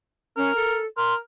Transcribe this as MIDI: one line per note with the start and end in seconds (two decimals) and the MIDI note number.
0.37 0.54 61
0.37 0.78 70
0.55 0.86 69
0.97 1.17 70
0.97 1.14 84